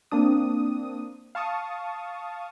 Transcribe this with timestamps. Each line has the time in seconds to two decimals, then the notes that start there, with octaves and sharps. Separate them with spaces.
0.11 A#3 C4 D4 D#6
1.35 F5 A5 C#6 D#6